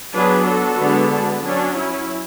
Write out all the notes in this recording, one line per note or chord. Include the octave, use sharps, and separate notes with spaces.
F#3 B3 D4 G#4 B4
F#4 A4
D3 G#3 B3 D4
D4
F#3 C#4 D4
E4